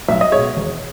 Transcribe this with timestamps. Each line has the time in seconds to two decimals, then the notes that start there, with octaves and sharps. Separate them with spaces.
0.08 B1 E5
0.21 D#5
0.32 B2 G#3 C#5
0.56 E1